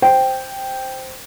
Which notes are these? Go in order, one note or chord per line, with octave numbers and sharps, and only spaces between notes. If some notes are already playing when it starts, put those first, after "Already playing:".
C5 G5